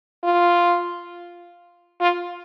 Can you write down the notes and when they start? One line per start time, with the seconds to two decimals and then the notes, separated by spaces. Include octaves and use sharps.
0.24 F4
2.01 F4